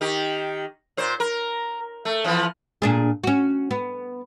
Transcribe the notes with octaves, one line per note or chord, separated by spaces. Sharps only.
D#3 G4
A#2 C5
A#4
A3
E3 F3 B3
A#2 D4 G#4
C#4 F#4
B3